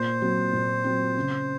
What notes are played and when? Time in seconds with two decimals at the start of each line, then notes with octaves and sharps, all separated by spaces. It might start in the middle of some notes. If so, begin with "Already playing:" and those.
Already playing: A#2 C5
0.22 F#3 C4
0.53 A#2
0.84 F#3 C4
1.16 C#3